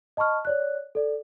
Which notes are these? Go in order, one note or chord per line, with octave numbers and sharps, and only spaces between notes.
D#5 A5 B5 C#6 F6
C#5 D5 F#6
A4 D5